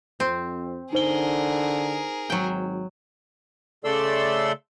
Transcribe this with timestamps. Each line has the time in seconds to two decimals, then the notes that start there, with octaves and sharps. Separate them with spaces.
0.20 F2 C4
0.93 D3 D#4 G#4 A#4 C5 G7
2.30 G#1 F#3 G5
3.84 C#3 A3 A4 D5 C6 E6